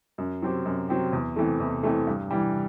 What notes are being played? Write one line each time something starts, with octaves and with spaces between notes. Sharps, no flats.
F#2
F#3 C4 G4
F#2
F#3 C4 G4
E2
C3 E3 A3
E2
C3 E3 A3
G2
E3 G3